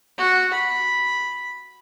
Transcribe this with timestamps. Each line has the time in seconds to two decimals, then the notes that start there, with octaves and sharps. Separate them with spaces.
0.18 F#4
0.53 B5